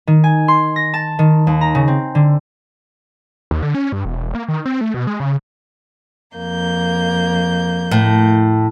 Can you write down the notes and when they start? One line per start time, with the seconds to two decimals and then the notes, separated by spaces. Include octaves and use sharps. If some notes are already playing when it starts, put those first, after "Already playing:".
0.07 D#3
0.24 G#5
0.48 C6
0.76 A#6
0.94 A5
1.19 D#3
1.47 D#2
1.61 A#5
1.75 C#3
1.88 C4
2.15 D3
3.51 D#2
3.63 D3
3.75 C#4
3.92 G2
4.05 E1
4.35 A#3
4.48 D#3
4.66 C4
4.81 A3
4.94 B2
5.07 G#3
5.20 C#3
6.36 F2 A#3 G6
7.91 A2